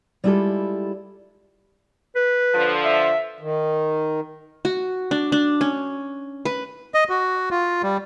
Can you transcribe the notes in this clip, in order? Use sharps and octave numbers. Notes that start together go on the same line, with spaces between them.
G3 G#3 E4 F4 G4 A4
B4
D3 F3
E5
D#3
F#4
D4
D4
C#4
B4
D#5
F#4
F4
G3